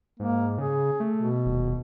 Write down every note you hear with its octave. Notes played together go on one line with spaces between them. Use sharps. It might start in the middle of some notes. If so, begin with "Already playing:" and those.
G#2 A#3
C#3 G#4
A3
B2
D#1